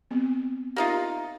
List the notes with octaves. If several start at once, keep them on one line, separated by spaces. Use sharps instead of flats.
B3 C4
A#3 D#4 F4 G4 E5